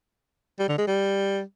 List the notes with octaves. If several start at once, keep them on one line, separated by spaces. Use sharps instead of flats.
G3
D3
G#3
G3